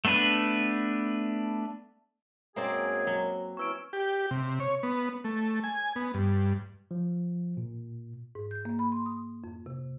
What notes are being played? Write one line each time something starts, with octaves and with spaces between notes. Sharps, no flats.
A3 B3 D4 B4
F#2 G#3 A#3 C4 G#4 D5
F#3
E3 F#3 C#4 C#6 E6 D7
G4
C3
C#5
B3
A3
G#5
B3
G2
F3
A#2
G#2
G6
A#3
B5
C6
D#6
F2
C3